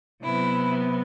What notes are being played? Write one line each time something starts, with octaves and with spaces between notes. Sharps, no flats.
C3 F#3 B3 E4